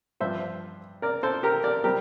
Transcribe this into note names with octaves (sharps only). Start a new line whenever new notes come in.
G2 F3 C4 C5 E5
A#4 D5
A4 C5
G4 A#4
A#4 D5
G3 C4 G4 A#4